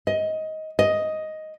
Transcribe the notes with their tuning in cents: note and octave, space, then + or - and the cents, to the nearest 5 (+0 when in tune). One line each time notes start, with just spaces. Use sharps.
D#5 +15
D#5 +5